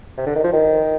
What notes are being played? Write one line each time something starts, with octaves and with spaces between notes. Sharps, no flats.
C3
D3
D#3
F3
D#3